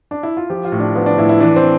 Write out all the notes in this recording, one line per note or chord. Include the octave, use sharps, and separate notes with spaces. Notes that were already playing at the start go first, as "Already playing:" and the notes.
D4
E4
F4
F3 G4
F4
A2
D4
F3 B3
D4
A2 E4
E4
E3 D4
C4